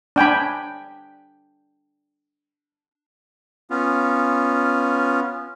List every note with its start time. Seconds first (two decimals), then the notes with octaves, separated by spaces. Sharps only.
0.16 D4 G5 G#5 B5
3.70 B3 C#4 F4